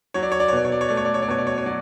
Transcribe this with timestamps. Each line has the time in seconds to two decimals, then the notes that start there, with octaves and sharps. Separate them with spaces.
0.14 F#3 C#5
0.23 D5
0.32 C#5
0.40 D5
0.48 C#5
0.53 B2 D5
0.65 C#5
0.72 D5
0.81 C#5
0.88 A3 D5
0.97 C#5
1.05 D5
1.14 C#5
1.22 D5
1.28 B2 C#5
1.38 D5
1.47 C#5
1.58 C#5
1.66 F#3 D5